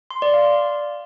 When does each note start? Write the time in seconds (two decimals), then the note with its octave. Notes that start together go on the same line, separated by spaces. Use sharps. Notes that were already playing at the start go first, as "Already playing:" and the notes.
0.11 C6
0.22 D5
0.34 F5